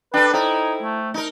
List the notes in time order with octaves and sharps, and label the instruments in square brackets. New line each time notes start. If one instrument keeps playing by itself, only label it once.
[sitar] D4 A4 [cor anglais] B4 [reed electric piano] G5 F#6
[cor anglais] D#4 [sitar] E4 [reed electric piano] A4 C5 G5
[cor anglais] A3
[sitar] D#4 A#4